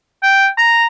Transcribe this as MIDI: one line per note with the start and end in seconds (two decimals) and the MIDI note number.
0.23 0.47 79
0.58 0.86 82